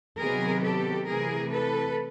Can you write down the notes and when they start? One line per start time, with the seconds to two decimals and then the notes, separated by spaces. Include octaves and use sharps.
0.19 C3 D#3 F#3 B3 G#4 A#4
0.63 G4 A4
1.06 C3 E3 A3 G#4 A#4
1.51 A4 B4